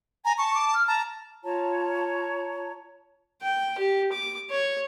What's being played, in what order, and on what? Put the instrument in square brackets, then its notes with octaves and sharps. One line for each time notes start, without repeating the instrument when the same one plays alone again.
[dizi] G#5 [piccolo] A#5
[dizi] A5 [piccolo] C#6
[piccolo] D6
F6
[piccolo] A5 [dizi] A#5
[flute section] F4 C#5 A5 A#5
[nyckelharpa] G5
G4
D6
C#5